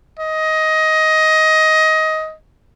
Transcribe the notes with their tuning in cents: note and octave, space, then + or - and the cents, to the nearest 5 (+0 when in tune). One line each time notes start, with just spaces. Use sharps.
D#5 +15